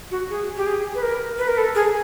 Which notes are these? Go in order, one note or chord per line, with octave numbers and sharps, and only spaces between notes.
F#4
G#4
G4
G#4
B4
A#4
B4
A#4
A4
G#4